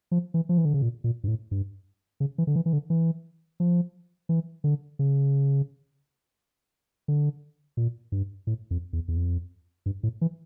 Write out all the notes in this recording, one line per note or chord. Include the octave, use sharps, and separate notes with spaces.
F3
E3
F3
E3
D3
C#3
A#2
A#2
G2
A2
G2
C#3
E3
D3
E3
E3
D3
E3
F3
E3
D3
C#3
D3
A#2
G2
A2
F2
E2
E2
F2
G2
A2
E3